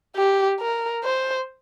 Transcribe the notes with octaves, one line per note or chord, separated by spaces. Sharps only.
G4
A#4
C5